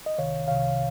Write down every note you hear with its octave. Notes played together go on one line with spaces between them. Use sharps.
D#5
C2 C3 D#3 C#5 F5
C2 C3 D#3 C#5 F5